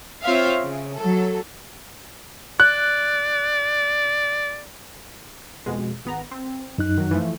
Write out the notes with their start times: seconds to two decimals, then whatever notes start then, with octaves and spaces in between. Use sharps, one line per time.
0.24 C4 F4 C5 C#5 E5 F5
0.61 C#3
0.97 F#3 A4
2.60 D5 F#6
5.66 F2 B2 G#3
6.05 G#1 B3 A#5
6.31 C4
6.78 F#2 D#4 F#6
6.97 D#3 F#3
7.11 E3 F3 A3